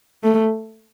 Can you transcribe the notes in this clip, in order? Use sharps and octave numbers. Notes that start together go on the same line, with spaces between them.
A3